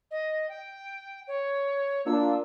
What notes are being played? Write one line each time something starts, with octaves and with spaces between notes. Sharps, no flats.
D#5
G5
C#5
A#3 D4 F4 E6